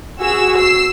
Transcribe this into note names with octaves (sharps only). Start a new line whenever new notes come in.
F#4 G#4 E6
E6 C7